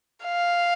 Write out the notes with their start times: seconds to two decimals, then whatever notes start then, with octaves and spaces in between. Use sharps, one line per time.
0.24 F5